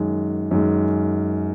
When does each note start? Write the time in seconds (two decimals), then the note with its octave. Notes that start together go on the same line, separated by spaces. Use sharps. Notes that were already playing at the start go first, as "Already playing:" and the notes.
Already playing: F#2 D#3 G#3
0.51 F#2 D#3 G#3